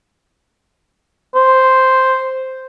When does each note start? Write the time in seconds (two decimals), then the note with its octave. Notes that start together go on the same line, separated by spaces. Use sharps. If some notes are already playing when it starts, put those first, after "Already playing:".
1.35 C5